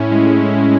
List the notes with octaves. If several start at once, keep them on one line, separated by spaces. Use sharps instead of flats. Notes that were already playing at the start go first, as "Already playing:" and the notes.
Already playing: A2 C#4 E4
G#3